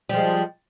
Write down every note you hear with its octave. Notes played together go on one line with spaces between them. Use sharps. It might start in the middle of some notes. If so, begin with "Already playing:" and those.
F3 G3 G#3